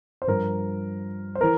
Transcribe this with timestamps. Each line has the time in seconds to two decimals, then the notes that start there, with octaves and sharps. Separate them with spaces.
0.22 C5
0.28 G2 F3 A#4
1.35 C5
1.41 E3 A#4